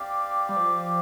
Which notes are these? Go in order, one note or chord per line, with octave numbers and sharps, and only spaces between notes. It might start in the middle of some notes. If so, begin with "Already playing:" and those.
Already playing: C4 G4 D5 F5
G3
F3